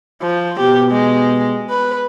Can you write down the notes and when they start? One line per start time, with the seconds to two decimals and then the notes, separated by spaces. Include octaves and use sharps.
0.22 F3
0.60 B2 G4
0.92 G#3
1.70 B4